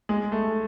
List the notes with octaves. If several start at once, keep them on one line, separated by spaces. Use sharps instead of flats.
G#3
A3